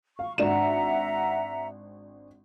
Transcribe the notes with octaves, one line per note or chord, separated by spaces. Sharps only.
F5 C#6
G#1 D4 E5 F#5 A#5 E7